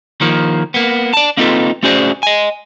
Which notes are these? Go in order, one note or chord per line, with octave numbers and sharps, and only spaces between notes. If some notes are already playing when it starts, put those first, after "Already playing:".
D#3 F3 A#3
A#3 B3
D5 A5
A#3 C4 D#4 F4 A4 B4
A3 C#4 F#4 G#4 C5 D5
D#5 G#5